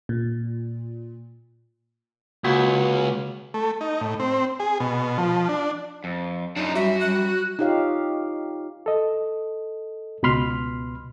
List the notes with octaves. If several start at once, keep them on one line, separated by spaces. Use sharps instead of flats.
A#2
C#2 A#3 F#4 F#5
A3
D#4
A2
C4
G#4
B2
F3
D4
F2
F#2 D4 D#4 D#5
G3 F#4 E5
G3 F#6
D#4 F4 G4 C#5 F5
A4 D#5
C#2 B2 B3 B5 C6 F6